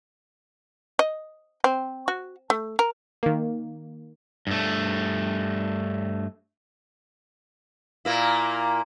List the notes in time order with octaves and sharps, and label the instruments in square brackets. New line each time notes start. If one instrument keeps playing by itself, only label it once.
[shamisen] D#5
C4
F#4
A3
A#4
[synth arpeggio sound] D#3 A#3
[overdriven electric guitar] G2 A3
[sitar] A#2 A#3 E4